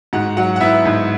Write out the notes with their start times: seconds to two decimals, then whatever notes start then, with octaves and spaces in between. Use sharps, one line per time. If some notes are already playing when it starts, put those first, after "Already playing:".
0.13 G#2 F#4 F#5
0.37 F#3 F#4 F#5
0.56 F#5
0.60 B3 E4 E5
0.85 G#2